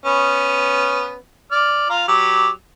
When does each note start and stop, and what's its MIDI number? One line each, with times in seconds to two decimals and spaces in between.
0.06 1.16 59
0.06 1.16 61
1.51 1.88 74
1.51 1.88 89
1.90 2.04 65
1.90 2.04 77
1.90 2.04 82
2.08 2.48 54
2.08 2.48 67